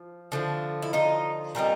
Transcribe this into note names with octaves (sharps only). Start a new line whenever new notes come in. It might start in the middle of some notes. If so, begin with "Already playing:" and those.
Already playing: F3
D3 F3 A3
E4
D#4 F4
A#2 G3 C4 D#4